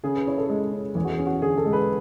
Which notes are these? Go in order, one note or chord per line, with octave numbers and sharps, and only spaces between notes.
C#3 G#4
B4
E4 C#5
A4
G#3
C#4
E2 G#4
F#4
G#4
C#4
F#4
D3 G#4
A4
G#3
B4